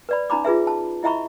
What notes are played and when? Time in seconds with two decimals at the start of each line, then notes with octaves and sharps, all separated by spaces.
0.09 B4 D5 B5
0.30 C#4 D#4 A#5 B5 D6
0.45 F4 G#4 B4 E5
0.67 A5
1.03 E4 D#5 E5 A#5 B5 C#6